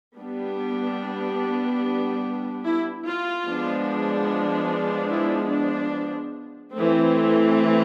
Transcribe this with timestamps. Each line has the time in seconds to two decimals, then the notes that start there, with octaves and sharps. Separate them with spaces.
0.19 G3 B3 D4
2.65 E4
3.05 F4
3.46 F3 G#3 B3 D4
5.10 E4
5.51 D4
6.74 E3 A3 C4